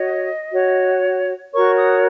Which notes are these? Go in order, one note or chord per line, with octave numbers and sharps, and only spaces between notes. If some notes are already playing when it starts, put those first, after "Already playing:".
Already playing: F#4 C#5 D#5
F#4 C#5
F#4 A#4 C#5 C#6
D#6